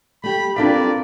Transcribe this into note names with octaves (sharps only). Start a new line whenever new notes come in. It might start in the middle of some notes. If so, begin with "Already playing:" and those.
A3 G4 B5
A#3 C4 D4 F4 A4 B4 D5 B6